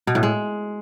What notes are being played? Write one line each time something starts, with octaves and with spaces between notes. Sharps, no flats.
B2
A2
G#3